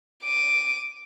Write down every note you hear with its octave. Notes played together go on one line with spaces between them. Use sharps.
D6 D#7